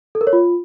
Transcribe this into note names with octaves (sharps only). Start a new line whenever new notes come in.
A4
A#4
C#5
F4